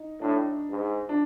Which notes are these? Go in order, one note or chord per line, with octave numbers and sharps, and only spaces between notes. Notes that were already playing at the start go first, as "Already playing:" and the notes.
Already playing: D#4
A2 D4
G#2
D4